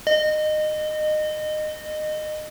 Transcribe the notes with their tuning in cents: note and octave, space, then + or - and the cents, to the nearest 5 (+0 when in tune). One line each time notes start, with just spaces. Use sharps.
D#5 -25